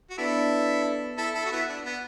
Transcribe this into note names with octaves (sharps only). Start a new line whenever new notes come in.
F#4
B3 D4 E4 A4 B4 D5
E4 A4
E4 A4
F#4
B3 E4
D4
B3